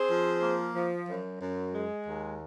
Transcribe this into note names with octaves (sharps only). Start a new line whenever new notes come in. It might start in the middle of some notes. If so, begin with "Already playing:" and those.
Already playing: C4 G#4 C5
F3
A#3
F3
F#2
F#2
G#3
D#2